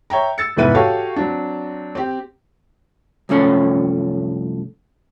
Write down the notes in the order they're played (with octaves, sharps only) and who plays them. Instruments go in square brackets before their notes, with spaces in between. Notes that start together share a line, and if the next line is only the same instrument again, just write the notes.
[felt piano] C#5 E5 G5 A#5
E6 A6 C#7
F1 G#2 B3 E4 B4 D#7
F#4 G4 A4 C#5 F5 F#5
F#3 C4 D4
C4 G4
[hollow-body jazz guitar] C2 F#2 F3 A3 C#4 C#5